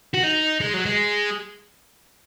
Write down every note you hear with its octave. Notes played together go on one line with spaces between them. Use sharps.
F#4
D#4
G#3
F#3
G#3